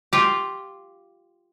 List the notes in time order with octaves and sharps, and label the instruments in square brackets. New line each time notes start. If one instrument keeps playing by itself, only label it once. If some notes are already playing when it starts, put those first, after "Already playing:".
[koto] F4 G4